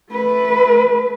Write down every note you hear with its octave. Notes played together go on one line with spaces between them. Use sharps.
A3 B4